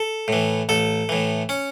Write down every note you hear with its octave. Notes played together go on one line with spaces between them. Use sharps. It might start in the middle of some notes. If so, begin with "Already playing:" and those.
Already playing: A4
A2 E3
A1 A4
A2 E3
C#4